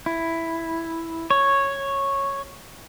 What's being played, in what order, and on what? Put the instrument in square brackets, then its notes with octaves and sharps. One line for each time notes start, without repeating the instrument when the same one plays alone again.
[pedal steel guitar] E4
C#5